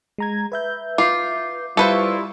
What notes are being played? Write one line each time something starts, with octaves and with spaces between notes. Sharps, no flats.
G#3 A#5 G#6
B4 E5 G6
F4 D6 C7
G3 E4 F4 A4 B4 C5 C#6